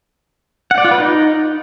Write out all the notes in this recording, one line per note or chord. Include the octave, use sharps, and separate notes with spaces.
F#5
D5
F4
B4
D#4